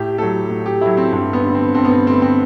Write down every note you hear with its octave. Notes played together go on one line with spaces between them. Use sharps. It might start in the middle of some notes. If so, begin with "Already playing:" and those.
Already playing: A2 G4
F#3 A3 A4
A2
G4
F#3 A3 E4
C4
G2 C4
B3
D3 A3
C4
G2 C4
B3
C4
D3 A3 C4
C4